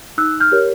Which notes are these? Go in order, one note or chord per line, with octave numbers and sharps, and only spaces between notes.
D#4 E6 F#6
F6 G6
G4 A#4 C#5